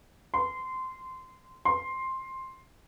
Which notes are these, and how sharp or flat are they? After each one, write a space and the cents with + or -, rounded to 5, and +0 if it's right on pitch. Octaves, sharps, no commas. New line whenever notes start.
C6 -15
C6 +10